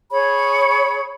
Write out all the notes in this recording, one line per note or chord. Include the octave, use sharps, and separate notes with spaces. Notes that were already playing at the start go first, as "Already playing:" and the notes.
G#4 C#5 B5